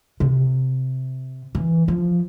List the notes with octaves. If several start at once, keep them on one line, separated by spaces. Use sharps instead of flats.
C3
E3
F3